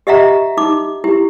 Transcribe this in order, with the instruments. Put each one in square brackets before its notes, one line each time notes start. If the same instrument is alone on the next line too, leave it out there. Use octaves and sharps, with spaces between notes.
[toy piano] G4 D#5 E5 F#5 A#5
D#4 D6
E4 G4